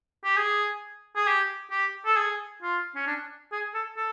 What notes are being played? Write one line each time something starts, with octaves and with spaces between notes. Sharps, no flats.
G4
G#4
G#4
G4
G4
A4
G#4
F4
C#4
D4
G#4
A4
A4